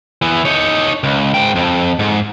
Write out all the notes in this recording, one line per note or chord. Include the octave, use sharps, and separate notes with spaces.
E3 B3
D#4 C#5
C#2
G#2 G5
F2
G#2